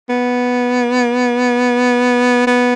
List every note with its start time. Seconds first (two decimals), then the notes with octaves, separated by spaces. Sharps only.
0.09 B3
2.47 B3